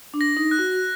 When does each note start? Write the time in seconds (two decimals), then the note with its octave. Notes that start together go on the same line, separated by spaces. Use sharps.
0.14 D4
0.21 A#6
0.37 D#4
0.51 F#6
0.59 F#4